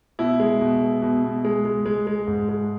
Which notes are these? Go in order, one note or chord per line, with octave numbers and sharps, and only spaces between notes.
B2 E4
G#3
B2
G#3
B2
B2
G#3
G#3
G#3
G#3
G#2
G#3